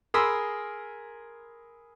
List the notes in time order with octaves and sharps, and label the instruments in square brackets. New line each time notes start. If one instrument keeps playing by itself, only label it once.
[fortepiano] G#4 A#4 B5 C6 D#6 E6